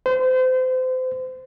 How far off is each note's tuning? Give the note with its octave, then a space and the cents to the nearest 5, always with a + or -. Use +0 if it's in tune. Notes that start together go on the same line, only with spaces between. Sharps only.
C5 -30